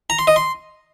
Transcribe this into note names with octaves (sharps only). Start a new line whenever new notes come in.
A#5
C6
D#5
C6